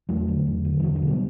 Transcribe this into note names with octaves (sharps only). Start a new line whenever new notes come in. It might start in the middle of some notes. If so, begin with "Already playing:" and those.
E2 F#3 A3
D3
E2
D3
E3
E2 D3 F#3
D3 F#3
B2
G3 B3